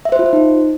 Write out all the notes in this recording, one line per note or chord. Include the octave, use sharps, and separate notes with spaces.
E5
C5
F4
C5
D#4